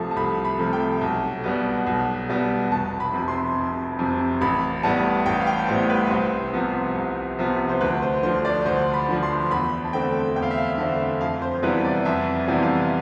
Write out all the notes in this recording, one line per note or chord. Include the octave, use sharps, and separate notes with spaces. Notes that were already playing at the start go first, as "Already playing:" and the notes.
Already playing: C2 C3 F3 A3 A5
A5
C2 B5
B5
C3 F3 A3
G5
B1
B2 G3 B3
B1
B2 G3 B3
F1 A5
B5
F2 C3
C6
F1
F2 C3
A1 B5
A2 G3 B3 A5
A1 G5
F5
G5
A2 G3 B3 C5
B4
C2 C5
C3 F3 B3
C2
C3 F3 B3
C5
D2 B4
C5
D3 F3 C5
D5
D2 C5
B5
D3 F3
C6
E2 B5
A5
D3 A3 C4 G5
E2 G5
F5
E5
F5
D3 A3 C4 E5
F2 F5
C5
C3 E3 G3 B3 B4
D5
F2 E5
C3 E3 G3 B3
F5